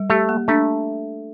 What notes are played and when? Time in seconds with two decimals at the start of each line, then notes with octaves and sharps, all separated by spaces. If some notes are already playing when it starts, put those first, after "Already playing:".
Already playing: G3
0.10 A3 G4
0.29 A#3
0.48 A3 D4